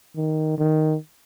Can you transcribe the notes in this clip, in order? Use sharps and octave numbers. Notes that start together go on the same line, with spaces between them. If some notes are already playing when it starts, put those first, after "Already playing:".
D#3
D#3